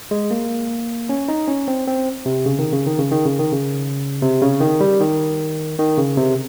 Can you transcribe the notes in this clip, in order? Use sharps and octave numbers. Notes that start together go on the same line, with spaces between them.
G#3
A#3
C#4
D#4
C#4
C4
C4
C3
C#3
D#3
C#3
D#3
C#3
D#3
C#3
D#3
C#3
C3
C#3
D#3
G3
D#3
D#3
C#3
C3